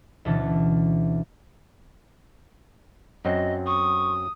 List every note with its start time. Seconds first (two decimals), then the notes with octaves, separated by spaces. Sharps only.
0.25 D2 B2 E3 C#4 A5
3.25 F#2 F#3 C4 D#5
3.66 C#6 D#6